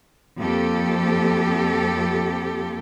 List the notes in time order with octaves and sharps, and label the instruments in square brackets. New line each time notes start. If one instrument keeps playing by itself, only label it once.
[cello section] F2 F3 A#3 G4 A4